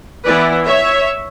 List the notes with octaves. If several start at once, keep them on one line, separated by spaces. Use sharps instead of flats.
E3 B3 E4 B4 D5
C#5 E5